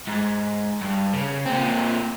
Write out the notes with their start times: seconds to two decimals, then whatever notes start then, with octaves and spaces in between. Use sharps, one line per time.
0.08 G#2
0.81 G2
1.14 C#3
1.46 A#2 C4